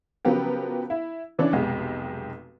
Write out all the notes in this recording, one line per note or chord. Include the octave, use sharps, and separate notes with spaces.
C#3 F3 F#3 B3 G4 A#4
E4
C#3 E3 C#4 D4
F1 B1 G#3 G4